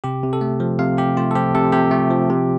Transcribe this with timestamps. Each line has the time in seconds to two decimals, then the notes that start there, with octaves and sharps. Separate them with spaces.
0.04 C3 G4
0.23 C3
0.33 A4
0.41 A3
0.60 F3
0.79 C3 F5
0.97 C3 G4
1.17 A3 F4
1.31 A4
1.35 F3 G4
1.55 C3 A4
1.72 C3 G4
1.91 A3
2.10 F3
2.30 C3